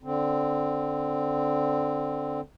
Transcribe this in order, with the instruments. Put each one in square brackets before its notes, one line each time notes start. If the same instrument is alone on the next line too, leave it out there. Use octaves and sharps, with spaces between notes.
[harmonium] D3 C4